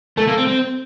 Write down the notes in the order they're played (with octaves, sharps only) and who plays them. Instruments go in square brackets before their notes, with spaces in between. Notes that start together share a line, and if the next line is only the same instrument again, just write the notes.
[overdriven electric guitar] A3 [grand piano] A4
[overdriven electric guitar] A#3
C4
C4